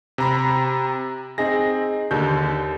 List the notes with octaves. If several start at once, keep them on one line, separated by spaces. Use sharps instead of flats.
C3 A#5 B5
C4 D#4 G#4 A#6
D#2 D3 G6